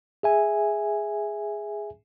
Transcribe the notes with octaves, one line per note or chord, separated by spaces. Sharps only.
G#4 E5 G#5